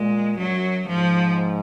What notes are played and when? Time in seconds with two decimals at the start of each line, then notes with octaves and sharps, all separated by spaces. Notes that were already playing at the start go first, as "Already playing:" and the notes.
Already playing: A#2 G#3
0.38 F#2 F#3
0.88 G#2 F3